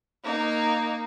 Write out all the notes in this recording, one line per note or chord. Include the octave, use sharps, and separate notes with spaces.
A#3 D#4